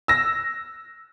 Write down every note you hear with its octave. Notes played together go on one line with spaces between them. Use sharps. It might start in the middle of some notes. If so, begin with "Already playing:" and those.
E6 A#6